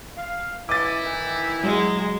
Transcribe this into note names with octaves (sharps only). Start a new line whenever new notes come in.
F5
E3 C#4 E4 D#5 D6 A6
D#3 E3 D#4
F#3 G#3